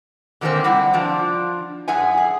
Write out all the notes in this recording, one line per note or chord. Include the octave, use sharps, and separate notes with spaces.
D3 D#3 F#3 G#3 A#3 C4
C3 G3 E4 F#5
F3 D4 F4
F#2 G#4 E5 F#5 G#5
G#4